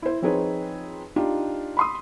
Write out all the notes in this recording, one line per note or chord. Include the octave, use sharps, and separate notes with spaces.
E4 C5
F3 C4 D#4 G#4 B4 C#5
D4 D#4 F4 G4
B5 C6 D#6